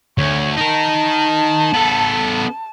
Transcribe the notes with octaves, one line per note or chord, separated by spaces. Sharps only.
D2 C#5
D#4 A#4 A5
B3 A4